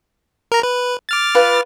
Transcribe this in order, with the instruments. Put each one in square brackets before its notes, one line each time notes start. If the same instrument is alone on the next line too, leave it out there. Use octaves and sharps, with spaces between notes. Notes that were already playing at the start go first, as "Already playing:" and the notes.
[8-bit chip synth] A#4 A#5
B4
D6 F6 A6
[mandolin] F4 B4